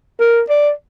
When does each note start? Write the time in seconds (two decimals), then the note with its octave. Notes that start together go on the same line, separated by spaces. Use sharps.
0.20 A#4
0.49 D5